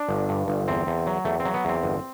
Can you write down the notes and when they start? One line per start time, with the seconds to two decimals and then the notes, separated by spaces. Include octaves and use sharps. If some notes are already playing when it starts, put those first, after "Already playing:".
Already playing: D4
0.09 G1
0.29 G2
0.48 G1
0.68 E2 C4
0.87 E2
1.07 F#3
1.25 E2 A3
1.40 C4
1.45 F#3
1.54 B3
1.65 E2 C4
1.83 G1